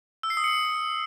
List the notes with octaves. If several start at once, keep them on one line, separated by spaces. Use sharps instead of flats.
E6
C7
D#6
C#7